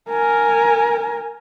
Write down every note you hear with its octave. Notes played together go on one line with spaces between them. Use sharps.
A#4 G#5